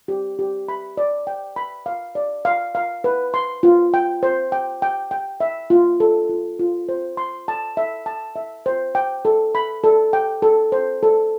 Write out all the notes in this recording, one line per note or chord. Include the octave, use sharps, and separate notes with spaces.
G4
G4
B5
D5
G5
B5
F5
D5
F5
F5
B4
C6
F4
G5
C5
G5
G5
G5
E5
F4
A4
F4
F4
C5
C6
A5
E5
A5
E5
C5
G5
A4
B5
A4
G5
A4
C5
A4